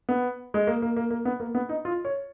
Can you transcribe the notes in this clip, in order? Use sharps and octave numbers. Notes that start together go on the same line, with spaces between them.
B3
G#3
A#3
A#3
A#3
A#3
B3
A#3
B3
D#4
F4
C#5